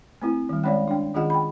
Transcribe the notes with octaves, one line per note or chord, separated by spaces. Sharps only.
A3 C4 E4
D#3 G3
G#3 C#4 C#5 D5 F5
D4 G5
D#3 C#4 F4 G#4 D#5 F#5
G5 B5